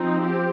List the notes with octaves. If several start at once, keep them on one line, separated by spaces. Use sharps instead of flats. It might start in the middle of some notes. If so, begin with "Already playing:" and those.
Already playing: F3 C4 D#4
G4